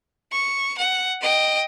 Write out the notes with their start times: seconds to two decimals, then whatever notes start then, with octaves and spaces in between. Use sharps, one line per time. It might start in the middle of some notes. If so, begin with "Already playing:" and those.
0.32 C#6
0.78 F#5
1.21 D#5 G5